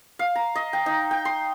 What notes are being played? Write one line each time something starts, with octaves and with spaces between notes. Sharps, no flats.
F5
A#5
D#5
G5
D#4
G5
C6